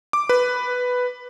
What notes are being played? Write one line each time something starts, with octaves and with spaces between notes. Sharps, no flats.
D6
B4